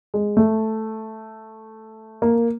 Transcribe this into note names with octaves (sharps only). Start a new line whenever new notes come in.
G#3
A3
A#3